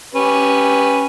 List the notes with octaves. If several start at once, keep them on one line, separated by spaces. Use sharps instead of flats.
C#4 G4 B4